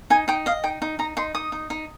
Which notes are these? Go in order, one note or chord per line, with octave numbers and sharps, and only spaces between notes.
D#4 G#5
D#4 G5
D#5 F5
D#4 G5
D#4
D#4 A#5
D#4 C6
D#4 D#6
D#4
D#4